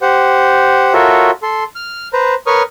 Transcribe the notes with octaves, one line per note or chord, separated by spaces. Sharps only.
G4 C5 F#5
F4 F#4 A4 A#4 C#5 E5
A4 C6
F6
B4 C5 A#5
A#4 B4 C#5 C#6 D#6 F6